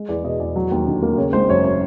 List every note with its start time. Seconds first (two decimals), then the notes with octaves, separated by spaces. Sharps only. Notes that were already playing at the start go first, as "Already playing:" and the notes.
Already playing: G#3
0.09 E2 D5
0.24 B2 D#5
0.40 E2 D5
0.56 F#3
0.71 D#2
0.87 D3
1.02 A#3
1.17 C#3 C#5
1.33 G#1 C5
1.49 F#2 C#5
1.64 C#5